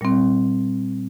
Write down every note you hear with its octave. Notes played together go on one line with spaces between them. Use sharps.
A#2 G3 C4